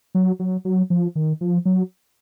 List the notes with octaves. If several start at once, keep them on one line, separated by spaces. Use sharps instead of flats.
F#3
F#3
F#3
F3
D#3
F3
F#3